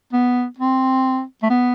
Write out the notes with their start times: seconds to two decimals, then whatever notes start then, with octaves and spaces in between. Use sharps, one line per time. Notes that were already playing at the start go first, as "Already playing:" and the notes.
0.13 B3
0.59 C4
1.43 A3
1.50 B3